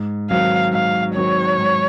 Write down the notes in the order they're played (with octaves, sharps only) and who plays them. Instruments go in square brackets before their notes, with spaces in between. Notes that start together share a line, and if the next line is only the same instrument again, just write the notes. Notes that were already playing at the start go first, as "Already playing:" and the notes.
Already playing: [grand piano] G#2
[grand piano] D#3 F#3 C4 F#4 [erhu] F5
[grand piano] G#2 [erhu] F5
[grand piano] D#3 F#3 C4 F#4 [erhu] C#5
[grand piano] G#2